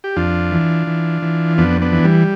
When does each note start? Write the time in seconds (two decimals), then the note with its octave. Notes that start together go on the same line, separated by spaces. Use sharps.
0.04 G4
0.16 F2 D4 F4
0.51 E3
0.87 E3
1.22 E3
1.58 F2 B3 D4
1.81 B3 D4
1.92 E3
2.04 G3